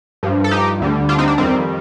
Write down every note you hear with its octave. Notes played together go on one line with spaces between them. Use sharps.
G2 F3
A4
D#4 G4
D2 D3 G3
D4 F4
C4 D#4
D4
F2 D#3 G3 C4